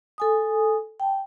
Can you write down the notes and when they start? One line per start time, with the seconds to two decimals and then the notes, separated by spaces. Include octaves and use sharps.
0.18 A4 G#5 D#6
1.00 G5 A5